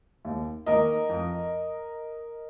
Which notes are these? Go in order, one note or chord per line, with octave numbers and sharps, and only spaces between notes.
D#2
D#3 A#3 A#4 D#5
F2